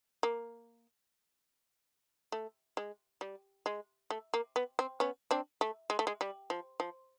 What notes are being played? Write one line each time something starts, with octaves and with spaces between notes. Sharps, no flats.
A#3
A3
G#3
G3
G#3
A3
A#3
B3
C4
B3 C#4
C4 D4
A3
G#3
A3
G#3
G3
F3
F3